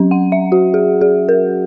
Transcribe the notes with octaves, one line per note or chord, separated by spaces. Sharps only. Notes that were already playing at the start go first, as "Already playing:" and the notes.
Already playing: F#3 C#4
F#5
E5
F#4
G#4
G#4
A#4